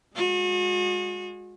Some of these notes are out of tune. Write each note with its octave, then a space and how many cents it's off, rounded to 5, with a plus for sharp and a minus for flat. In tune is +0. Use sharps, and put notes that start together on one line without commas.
G#3 -10 F#4 -40